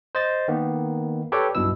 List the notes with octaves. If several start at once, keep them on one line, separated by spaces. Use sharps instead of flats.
C5 D#5 A6
D#3 A#3 B3
G4 A4 B4 C#5 D5 G5
B1 G2 B2 E4 E6